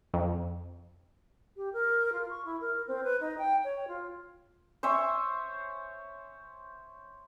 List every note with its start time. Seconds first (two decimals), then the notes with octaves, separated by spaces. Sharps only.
0.14 F2
1.56 G4
1.73 A#4
2.12 F4
2.29 C#6
2.45 E4
2.60 A#4
2.87 C4
3.03 B4
3.20 D#4
3.38 G5
3.64 C#5
3.87 F4
4.83 C5 C#5 E5 G#5